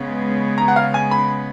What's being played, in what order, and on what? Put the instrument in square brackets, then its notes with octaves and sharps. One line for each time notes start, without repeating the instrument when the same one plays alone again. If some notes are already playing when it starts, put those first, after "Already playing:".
Already playing: [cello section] C#3 G#3 B3
[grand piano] A#5
F#5
F5
G#5
B5